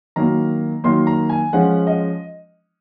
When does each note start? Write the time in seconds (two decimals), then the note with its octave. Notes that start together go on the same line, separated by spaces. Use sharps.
0.16 D#3 F#3 A#3 A#5
0.84 D#3 F#3 A#3 C6
1.07 A#5
1.30 G#5
1.53 F3 G#3 C#4 F#5
1.87 D#5